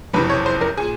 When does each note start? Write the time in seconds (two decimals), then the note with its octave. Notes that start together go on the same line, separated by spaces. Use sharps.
0.13 F#1 F2 C3 E3 B4
0.29 C#5
0.46 C5
0.61 A#4
0.77 A#2 G#4